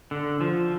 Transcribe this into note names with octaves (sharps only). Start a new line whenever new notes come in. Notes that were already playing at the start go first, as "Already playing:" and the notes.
D3
F3